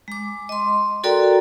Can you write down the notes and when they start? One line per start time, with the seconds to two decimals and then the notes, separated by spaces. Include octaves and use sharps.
0.08 G#3 D6
0.49 D#5 C6
1.04 F#4 A4 A#4 D5 G5 A#5